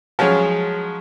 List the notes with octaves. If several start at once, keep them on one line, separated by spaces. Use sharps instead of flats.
F3 F#3 G#3 C#4